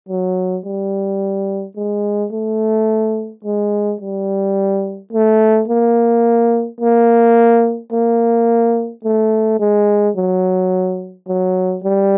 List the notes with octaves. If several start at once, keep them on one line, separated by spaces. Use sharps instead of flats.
F#3
G3
G#3
A3
G#3
G3
A3
A#3
A#3
A#3
A3
G#3
F#3
F#3
G3